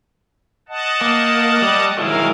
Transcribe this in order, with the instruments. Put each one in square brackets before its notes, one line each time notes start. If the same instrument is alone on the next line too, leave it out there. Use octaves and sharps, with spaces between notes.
[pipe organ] D#5 F#5 A5
[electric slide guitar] A#3
G3
[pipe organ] D#3 A#4 F5 [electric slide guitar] F#3 G#3 E4